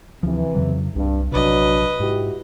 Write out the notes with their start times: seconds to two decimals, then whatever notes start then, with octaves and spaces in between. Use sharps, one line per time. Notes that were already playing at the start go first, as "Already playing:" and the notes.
0.23 D2 C3 E3 F3
0.55 F2 C#3 F#3
0.96 C2 G2
1.32 A#1 C3 F#3 D4 B4 D#5
2.00 G#2 E4 F#4 G4